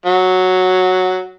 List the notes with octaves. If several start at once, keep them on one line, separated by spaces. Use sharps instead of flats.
F#3